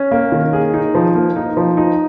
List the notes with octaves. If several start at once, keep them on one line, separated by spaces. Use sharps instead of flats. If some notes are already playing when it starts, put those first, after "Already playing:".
Already playing: C#4
A#3
D#3
G#4
D#4
F3
A#3
D#4
F3
D#4